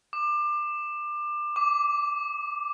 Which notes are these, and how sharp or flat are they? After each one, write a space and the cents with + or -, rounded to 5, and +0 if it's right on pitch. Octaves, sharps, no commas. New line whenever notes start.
D6 +25
D6 -5